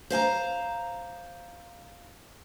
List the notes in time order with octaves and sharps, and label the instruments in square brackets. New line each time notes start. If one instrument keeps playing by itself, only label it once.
[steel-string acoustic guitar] C5 F5 G#5 A#5